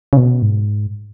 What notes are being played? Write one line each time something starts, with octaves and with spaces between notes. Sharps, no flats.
C#3
B2
G#2